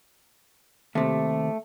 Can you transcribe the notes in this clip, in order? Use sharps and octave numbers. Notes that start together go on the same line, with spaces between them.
D#2 C3 A3